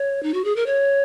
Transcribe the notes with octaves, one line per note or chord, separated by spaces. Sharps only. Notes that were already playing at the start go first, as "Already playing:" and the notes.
Already playing: C#5
D#4
F#4
G#4
A#4
C#5